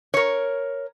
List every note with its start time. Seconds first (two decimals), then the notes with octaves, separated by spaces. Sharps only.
0.14 A#4 C#5